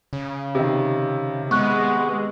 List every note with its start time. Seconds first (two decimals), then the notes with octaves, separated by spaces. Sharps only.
0.13 C#3
0.55 C3 D#3
1.51 G#3 B3 C#6 F#6